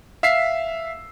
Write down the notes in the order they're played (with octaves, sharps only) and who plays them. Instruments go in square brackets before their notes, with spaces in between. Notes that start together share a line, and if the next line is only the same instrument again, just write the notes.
[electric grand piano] E5 F5 E6 B6 C7